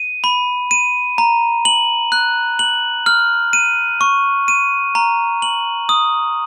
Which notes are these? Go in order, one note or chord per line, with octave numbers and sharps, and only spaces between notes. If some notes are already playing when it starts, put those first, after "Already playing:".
Already playing: D#7
B5
D#7
A#5
F#7
F#6
F#7
F6
D#7
C#6
D#7
A#5
F#7
D#6